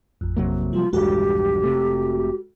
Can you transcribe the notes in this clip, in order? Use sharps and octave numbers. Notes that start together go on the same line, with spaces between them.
A1 F2
C3 F#3 A#3
F3 G3 F4
A#1 E2 G2 G#3 F#4 G4 A4
F1 C3 A3